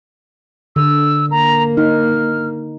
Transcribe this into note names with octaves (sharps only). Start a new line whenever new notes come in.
D3 E6
A#3 A#5
D#4 F6